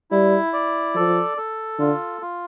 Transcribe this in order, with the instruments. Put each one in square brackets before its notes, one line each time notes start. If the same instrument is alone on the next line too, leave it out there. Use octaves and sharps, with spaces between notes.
[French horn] G3 [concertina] E4
[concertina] D5
[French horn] F3 [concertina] A4
[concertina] A4
[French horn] D3 [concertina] F4
[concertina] F4